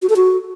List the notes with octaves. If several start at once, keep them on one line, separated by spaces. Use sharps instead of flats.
F#4
A4
F#4